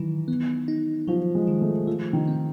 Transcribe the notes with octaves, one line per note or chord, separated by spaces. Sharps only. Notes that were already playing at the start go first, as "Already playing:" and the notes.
Already playing: D#3 E3 F#3 D#4
B3
D#4
F3 F#3
G#3
D#3
A3
F3 A3
D#3
C4